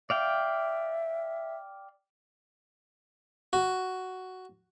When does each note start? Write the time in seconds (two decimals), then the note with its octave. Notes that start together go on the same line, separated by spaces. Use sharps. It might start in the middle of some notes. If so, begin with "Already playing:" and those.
0.10 D5 E5 F5 G5
3.53 F#4